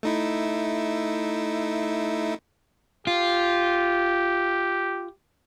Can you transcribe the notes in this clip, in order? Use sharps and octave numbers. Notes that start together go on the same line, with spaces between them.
A3 D#4 E4
F4 G4